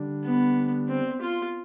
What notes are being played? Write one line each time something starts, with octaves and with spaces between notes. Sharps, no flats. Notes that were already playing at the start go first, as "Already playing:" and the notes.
Already playing: D3 G3 D4
B3
C4
F4